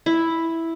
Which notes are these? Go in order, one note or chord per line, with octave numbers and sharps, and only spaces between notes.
E4